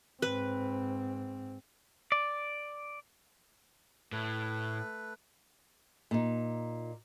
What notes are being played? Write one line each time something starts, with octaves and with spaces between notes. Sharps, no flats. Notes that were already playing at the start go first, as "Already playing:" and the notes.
G#2 C4 B4
D5
A2 A3 B4
A#2 D#4